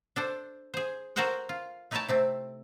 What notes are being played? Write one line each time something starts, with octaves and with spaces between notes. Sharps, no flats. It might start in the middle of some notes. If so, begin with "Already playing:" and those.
D4 A4 C5
G#4 C5
F#4 A4 A#4 C5 F#5 G5
F4
A3 D#4 E4 C#5 G5 A5
C3 A3 C4